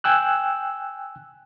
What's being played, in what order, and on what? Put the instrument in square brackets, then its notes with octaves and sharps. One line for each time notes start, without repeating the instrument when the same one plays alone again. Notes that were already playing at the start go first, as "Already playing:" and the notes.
[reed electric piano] G5 G#5 E6 F#6